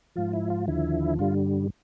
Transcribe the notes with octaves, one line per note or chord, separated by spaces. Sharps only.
G#2 F3 F4
E4
F4
D#2 D3 F3 E4
G2 D3 G3 F4